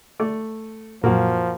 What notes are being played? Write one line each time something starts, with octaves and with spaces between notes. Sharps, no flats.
A3 D5
F#2 A#2 F3 A#3 F#4